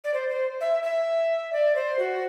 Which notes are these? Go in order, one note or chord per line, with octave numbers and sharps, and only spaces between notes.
D5
C5
C5
E5
E5
D5
C5
F#4